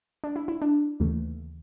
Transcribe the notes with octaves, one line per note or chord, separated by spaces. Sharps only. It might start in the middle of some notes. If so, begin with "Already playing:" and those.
D4
E4
E4
D4
D#2 C#3 E3 A3